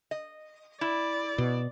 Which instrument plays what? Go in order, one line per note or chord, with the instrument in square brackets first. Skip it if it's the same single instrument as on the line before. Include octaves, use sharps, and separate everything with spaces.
[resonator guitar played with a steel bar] D#5
[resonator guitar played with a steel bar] E4 [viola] D5
[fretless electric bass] B2